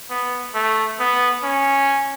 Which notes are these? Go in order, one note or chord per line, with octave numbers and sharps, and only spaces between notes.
B3
A3
B3
C#4